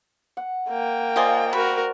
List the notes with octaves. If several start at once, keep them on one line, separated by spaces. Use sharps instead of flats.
F#5
A#3 G5
F4 C5 D5 D#5 G#5
F#4 A#4 B5